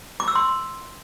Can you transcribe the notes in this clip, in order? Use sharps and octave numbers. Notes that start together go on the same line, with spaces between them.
D6
E6
C6